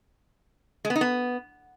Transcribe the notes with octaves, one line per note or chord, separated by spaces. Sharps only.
G#3
B3
D#4
B3